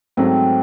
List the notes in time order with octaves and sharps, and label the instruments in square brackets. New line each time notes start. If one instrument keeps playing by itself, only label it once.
[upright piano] G#2 F#3 A3 [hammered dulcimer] C4